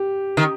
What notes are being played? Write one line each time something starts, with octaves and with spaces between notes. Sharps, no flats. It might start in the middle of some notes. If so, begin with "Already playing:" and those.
Already playing: G4
D#3